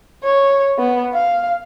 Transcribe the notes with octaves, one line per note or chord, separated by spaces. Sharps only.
C#5
B3
F5